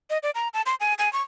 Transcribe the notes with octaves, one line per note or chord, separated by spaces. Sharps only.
D#5
D5
A#5
A5
C6
G#5
G#5
C#6